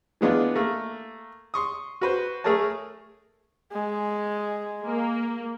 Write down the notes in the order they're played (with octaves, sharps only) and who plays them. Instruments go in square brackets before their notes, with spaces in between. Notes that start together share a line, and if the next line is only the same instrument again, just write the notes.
[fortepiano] E3 G#3 B3 D4 F4
A3 A#3
C6 C#6 D#6
F#4 B4 C5
A3 G#4 A#4 C#5 A5
[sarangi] G#3
[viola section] A#3